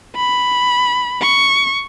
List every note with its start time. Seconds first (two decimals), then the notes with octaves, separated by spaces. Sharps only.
0.16 B5
1.22 C#6